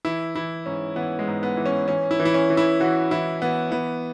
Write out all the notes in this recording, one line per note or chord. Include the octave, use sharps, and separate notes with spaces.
E3 E4
E3 E4
G#2 C#4
E3 B3
G#3
G#2
B3
E3
C#4
E3 C#4
E4
E3
E4
C#4
E3
E4
E3 F#4
E3 E4
E3 B3
E3 B3